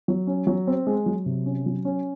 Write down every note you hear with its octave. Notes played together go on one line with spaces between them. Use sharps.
F#3
C#4
F#3
C4
G#3
F#3
C3
C#4
F#3
C#4